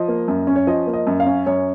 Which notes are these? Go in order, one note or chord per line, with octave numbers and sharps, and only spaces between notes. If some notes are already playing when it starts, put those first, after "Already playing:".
Already playing: F3 D#5
A#3
F#2
C#4
C#5
F3 D#5
A#3
D#5
F#2
F5
C#4
F#2 C#5